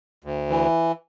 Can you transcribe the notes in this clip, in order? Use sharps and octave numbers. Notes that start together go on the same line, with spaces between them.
D2
E3